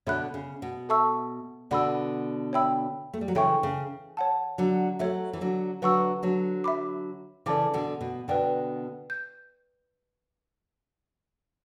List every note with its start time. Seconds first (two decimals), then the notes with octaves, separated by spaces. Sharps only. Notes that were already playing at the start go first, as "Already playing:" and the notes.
0.07 B2 D3 C#5 E5 B5 F#6
0.34 C#3
0.62 B2
0.89 A4 E5 A5 C#6 E6
1.71 B2 D3 D5 F#5 B5 E6
2.53 C#5 E5 G5 B5 E6
3.14 A3
3.21 G3
3.28 F#3
3.35 C#3 E3 A4 C#5 E5 G5 C#6
3.63 C#3
4.17 C#5 F#5 A5
4.58 D3 F#3
4.99 F#3 A3 A4 C#5 E5
5.33 E3
5.41 D3 F#3
5.82 D3 F#3 B4 F#5 C#6 E6
6.23 D3 F#3
6.64 E5 B5 D6
7.46 C#3 E3 A4 D5 A5 D6
7.74 B2 D3
8.01 B2
8.28 B2 D3 B4 D5 G5
9.10 G6